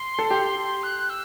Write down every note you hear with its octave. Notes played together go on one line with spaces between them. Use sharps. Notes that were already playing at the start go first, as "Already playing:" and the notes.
Already playing: C6
A4
G4
F#6
E6